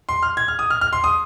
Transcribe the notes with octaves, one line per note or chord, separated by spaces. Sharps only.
C6
F6
G#6
F6
D#6
F6
F6
C6
D#6